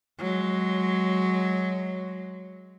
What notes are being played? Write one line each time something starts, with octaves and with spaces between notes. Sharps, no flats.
F#3 G#3